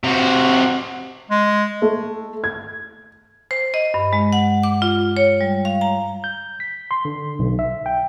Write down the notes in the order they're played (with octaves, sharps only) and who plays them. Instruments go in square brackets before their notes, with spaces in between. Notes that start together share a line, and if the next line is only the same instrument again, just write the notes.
[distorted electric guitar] C3 F#4
[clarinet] G#3
[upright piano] A3
G#6
[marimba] C5
D#5
G2
G#3
F#5
D6
F4
C#5
G3
F5
A#5
[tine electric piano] G6
B6
C6
D3
B1
E5
G5